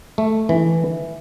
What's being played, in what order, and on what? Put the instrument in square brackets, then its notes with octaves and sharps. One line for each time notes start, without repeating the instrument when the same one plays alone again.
[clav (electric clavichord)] A3
E3